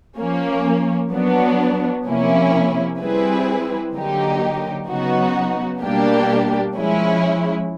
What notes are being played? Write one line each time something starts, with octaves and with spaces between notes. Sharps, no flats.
F3 A#3 C#4
F#3 B3 D4
C3 F3 A#3 C#4 E4
G3 C4 E4 G#4 B4
D3 F#3 A#3 D#4 G4
C#3 F#3 B3 D#4 F#4
B2 G3 A#3 D4 G4
F3 G#3 C#4 E4